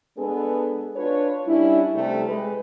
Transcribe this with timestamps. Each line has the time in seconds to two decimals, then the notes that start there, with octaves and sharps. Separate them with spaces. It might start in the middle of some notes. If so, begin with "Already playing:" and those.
0.18 G#3 B3 D4 G#4 A4 B4
0.96 D4 F4 B4 C#5
1.47 G3 C#4 D4 E4
1.95 C3 G3 A3 G4
2.27 G#3 B4